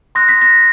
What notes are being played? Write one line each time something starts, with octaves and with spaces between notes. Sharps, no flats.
C6 D#6 F#6 A#6
B6
A#6